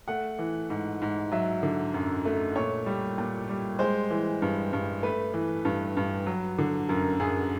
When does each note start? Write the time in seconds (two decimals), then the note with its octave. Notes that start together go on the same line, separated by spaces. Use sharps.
0.08 A3 F#5
0.39 E3
0.70 G#2
1.02 G#2
1.32 F#3 E5
1.63 D3
1.94 F#2
2.25 A3
2.56 A#2 C#5
2.86 G3
3.18 A#2
3.49 G3
3.79 G#3 C5
4.11 E3
4.42 G2
4.73 G2
5.03 A3 B4
5.34 E3
5.65 G2
5.97 G2
6.26 F#3
6.58 D3
6.89 F#2 A#4
7.20 F#2 G#4